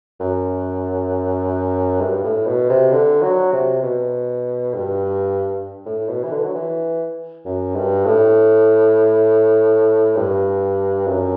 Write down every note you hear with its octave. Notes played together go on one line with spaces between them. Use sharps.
F#2
G2
A2
B2
C3
D3
F#3
C3
B2
G2
A2
B2
E3
D3
F#3
E3
F#2
G2
A2
G2
F#2